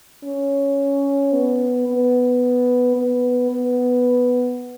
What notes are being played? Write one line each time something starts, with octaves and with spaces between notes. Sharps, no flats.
C#4
B3
B3
B3
B3